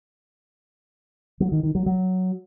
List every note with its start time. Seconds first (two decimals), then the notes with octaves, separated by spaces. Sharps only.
1.40 F#3
1.52 D#3
1.63 D#3
1.75 F#3
1.86 F#3